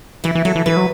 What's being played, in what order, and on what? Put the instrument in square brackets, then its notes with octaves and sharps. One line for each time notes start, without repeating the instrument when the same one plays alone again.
[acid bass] E3 [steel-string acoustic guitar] E4
[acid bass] E3
[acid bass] F#3 [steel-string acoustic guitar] A4
[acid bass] E3
[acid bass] E3 [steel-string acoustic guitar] B4
[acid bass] F#3